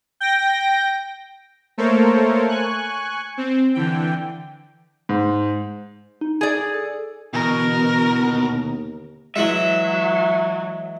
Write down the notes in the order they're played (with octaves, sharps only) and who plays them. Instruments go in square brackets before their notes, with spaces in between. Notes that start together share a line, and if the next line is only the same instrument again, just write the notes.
[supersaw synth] G5 A#6
A3 A#3 A4 A#4 C5 C#5
G#5 C#6 F#6
C4
D3 E3 G5
[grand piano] G#2
[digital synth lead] D#4
[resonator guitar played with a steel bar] G#4 D5
[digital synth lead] D#6
A4
[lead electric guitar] B2 [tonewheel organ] D3 B3 [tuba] E3 [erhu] A#4
[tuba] D#2
[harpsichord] E3 G#3 [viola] F#3 [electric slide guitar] E5